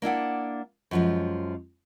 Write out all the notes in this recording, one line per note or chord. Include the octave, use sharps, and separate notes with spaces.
A#3 D4 E4 F#5
F#2 F3 G#3